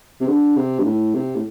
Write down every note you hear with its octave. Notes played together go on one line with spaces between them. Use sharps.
C3
D3
C3
G2
A2
C3
A2